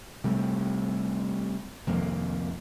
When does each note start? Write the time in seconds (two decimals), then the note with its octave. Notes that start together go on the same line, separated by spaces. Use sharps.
0.24 C3 G3 A3
1.87 C2 F2 D#3 A#3